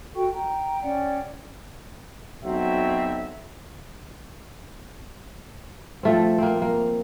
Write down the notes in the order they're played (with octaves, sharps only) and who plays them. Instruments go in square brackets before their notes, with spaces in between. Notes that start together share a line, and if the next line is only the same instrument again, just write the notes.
[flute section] F#4 A4 G5 C#6
G5 A#5
C#4 D5 F#5 G5
[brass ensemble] B1 F#3 C4 E5
[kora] F3 A3 C4
A#3 C4
A#3